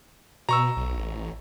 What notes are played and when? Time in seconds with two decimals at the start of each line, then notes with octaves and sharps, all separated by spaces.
0.49 B2 A#5 C#6 E6
0.77 B1
0.97 A1